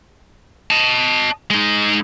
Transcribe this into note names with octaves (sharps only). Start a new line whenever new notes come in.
D#5 A5
G#3 D#4